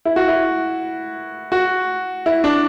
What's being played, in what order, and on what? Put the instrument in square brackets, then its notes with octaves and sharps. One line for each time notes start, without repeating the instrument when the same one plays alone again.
[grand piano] E4
F#4
E4
F#4
E4
D4